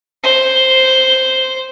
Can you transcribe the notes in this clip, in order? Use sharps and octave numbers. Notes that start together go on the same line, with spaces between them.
C5